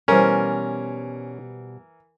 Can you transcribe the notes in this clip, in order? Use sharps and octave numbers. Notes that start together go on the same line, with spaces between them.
B2 E3 G3 C#4 A#4 C5